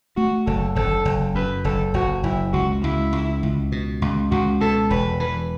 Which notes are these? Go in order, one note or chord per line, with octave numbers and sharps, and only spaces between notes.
A3 F#4
F#1 A4
F#1 A4
F#1
F#2 B4
F#1 A4
F#1 F#4
F#1 E4
C#2 F#4
C#2 E4
C#2
C#2
B2
C#2
C#2 F#4
B2 A4
E1 B4
E3 B4